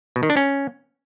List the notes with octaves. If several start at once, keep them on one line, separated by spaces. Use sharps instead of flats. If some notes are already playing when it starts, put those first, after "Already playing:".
B2
D#3
D4
C#4